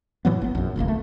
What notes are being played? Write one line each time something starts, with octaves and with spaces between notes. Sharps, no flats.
A2 E3 F#3 B3
G#1 B3
A#1 F#2
D#1 G#1 C#2 A#3
A3